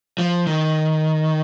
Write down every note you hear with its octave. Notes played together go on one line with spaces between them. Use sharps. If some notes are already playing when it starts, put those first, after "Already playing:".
F3
D#3